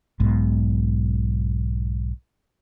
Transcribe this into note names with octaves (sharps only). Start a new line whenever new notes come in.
B1 G#2 B2